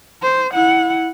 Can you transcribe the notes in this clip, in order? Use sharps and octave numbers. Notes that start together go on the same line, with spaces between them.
C5
E4 F#5